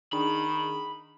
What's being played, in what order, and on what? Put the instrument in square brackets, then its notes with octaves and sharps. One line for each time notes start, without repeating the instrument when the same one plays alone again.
[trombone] D#3 [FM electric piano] D4 D#4 G#4 [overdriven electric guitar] B5